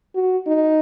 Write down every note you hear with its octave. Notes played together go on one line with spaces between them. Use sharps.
F#4
D#4